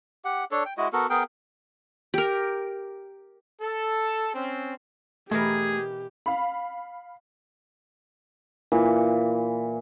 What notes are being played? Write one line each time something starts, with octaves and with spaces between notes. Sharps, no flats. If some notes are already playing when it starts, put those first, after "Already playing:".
G4 F#5
D4 A4 C#5
G5
G#3 E4 F#4 D#5
B3 F#4 A4 A#4
B3 G#4 A#4 G5
G4 A#4
A4
C4 C#4
B2 E3 A3 G4 G#4 A#4
F5 B5
A#2 E3